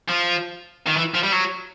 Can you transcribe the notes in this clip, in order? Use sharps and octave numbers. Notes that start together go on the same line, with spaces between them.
F3
D#3
E3
F3
G3
F#3